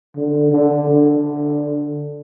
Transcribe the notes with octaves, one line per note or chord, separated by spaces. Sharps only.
D3
D3
D3